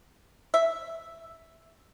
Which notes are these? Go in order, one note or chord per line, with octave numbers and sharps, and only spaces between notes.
E5